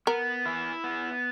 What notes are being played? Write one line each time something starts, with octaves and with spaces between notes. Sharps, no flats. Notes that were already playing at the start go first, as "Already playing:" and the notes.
B3 A#4
E4
B3